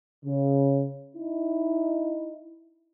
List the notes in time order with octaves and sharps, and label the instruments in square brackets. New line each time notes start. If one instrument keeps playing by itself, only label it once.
[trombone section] C#3
D#4 E4